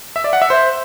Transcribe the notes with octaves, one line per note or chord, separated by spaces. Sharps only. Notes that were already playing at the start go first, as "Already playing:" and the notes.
E5
D5
F#5
E5
C5